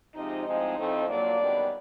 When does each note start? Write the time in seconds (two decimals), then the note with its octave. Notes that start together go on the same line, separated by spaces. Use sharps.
0.15 C3 F3 G#3 D#4 D#5
0.46 A2 F3 G#3 C4 D#4 D#5
0.77 A2 F3 A3 C4
1.07 A#2 F#3 A#3 D4 D5
1.39 F#2 D#3 G3 B3